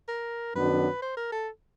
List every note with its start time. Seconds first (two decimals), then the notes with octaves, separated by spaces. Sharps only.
0.08 A#4
0.55 F#2 D#3 F#3 B3 D4 B4
1.02 C5
1.17 A#4
1.32 A4